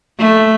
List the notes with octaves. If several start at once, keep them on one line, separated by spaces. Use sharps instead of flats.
A3